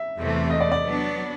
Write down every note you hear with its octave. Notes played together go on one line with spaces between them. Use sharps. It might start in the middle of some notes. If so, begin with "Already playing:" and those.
Already playing: E5
E2 C3 E3 A3
D#5
D5
D5
F#3 B3 D4